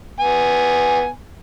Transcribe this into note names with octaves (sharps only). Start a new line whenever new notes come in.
B3 G#5